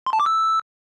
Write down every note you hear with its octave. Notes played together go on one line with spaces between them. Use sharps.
C6
A5
D6
E6